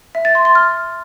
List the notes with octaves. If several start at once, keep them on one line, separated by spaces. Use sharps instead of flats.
E5
A6
C6
C6
F6